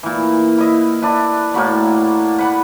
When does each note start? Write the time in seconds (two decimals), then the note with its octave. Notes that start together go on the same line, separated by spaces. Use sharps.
0.03 A#2 E3
0.58 E4 D#5 E5
1.02 D4 E4 B4
1.54 A2 A#3 F#4 B5
2.39 B4 F#5 B5